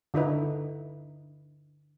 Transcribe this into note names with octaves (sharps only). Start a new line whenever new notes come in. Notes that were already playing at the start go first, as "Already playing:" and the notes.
D3 D#4 E4 B4